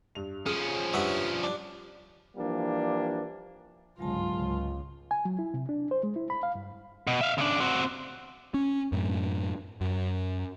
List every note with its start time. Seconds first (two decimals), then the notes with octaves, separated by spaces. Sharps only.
0.15 G2 F7
0.46 F3 C#4 G#4 F6
0.93 G2 B4 C#5 E5 F#5 D#6
1.43 D4
2.36 E3 F3 G3 A#3 D4
3.99 G1 C#2 G#2 F#3 G#3 F4 A5
4.34 C#2
5.11 G#5
5.25 F#3
5.39 E4
5.54 C3
5.69 D4
5.91 C5
6.03 G#3
6.16 E4
6.30 B5
6.43 F5
6.55 G2
7.07 B2
7.21 E5 F5
7.38 C#3 D4
7.61 C4 F#4
8.54 C#4
8.92 F#2 A2
9.81 F#2